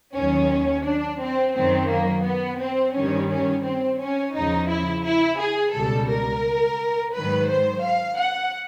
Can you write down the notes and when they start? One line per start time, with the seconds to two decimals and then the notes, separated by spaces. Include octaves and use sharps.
0.17 D#2 D#3 F#3 C#4
0.86 D4
1.22 C4
1.56 F#2 D#3 F#3 C4
1.91 A#3
2.27 B3
2.61 C4
2.96 G2 D#3 G3 C#4
3.31 C#4
3.66 C4
4.01 C#4
4.36 E2 C#3 F3 D#4
4.70 E4
5.05 E4
5.40 G#4
5.75 C#2 B2 G3 A4
6.11 A#4
7.15 G#2 D#3 F#3 B4
7.50 C5
7.85 F5
8.20 F#5